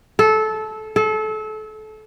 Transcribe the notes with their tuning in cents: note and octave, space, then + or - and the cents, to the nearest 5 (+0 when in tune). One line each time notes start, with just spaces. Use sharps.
A4 -20
A4 -30